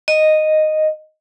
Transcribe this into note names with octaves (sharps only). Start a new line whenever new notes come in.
D#5